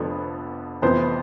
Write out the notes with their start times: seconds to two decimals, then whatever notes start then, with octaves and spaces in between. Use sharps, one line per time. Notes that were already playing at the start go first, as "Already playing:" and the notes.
Already playing: F1 F2 D3 F3 B3
0.82 F1 F2 E3 B3 C5